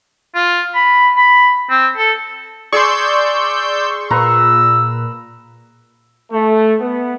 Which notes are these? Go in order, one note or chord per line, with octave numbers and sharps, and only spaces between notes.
F4
B5
B5
C4
A4
G#4 D5 C6 C#6 E6 G6
A#2 B4 A#5 E6
A3
B3